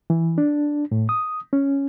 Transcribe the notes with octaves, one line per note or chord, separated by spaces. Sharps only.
E3
D4
A2
D#6
C#4